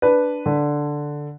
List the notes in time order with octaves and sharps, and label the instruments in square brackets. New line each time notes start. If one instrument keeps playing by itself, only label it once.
[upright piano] D4 B4
D3